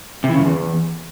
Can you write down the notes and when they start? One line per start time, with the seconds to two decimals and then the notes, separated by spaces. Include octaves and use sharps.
0.24 C3
0.29 E3
0.34 C#3
0.40 F#2
0.45 E2